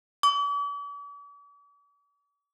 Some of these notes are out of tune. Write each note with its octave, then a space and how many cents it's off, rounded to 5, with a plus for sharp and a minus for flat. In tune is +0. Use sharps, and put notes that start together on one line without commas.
D6 -45